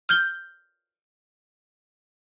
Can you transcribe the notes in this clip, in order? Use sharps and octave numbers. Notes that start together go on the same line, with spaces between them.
F6 G6 G7